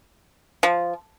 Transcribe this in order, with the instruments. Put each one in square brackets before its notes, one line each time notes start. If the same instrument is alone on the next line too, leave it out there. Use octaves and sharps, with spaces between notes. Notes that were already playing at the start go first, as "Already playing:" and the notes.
[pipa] F3